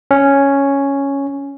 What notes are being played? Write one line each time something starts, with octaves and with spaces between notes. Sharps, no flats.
C#4